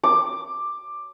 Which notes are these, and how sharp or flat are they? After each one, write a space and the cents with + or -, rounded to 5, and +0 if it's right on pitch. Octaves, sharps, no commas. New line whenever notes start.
D6 +10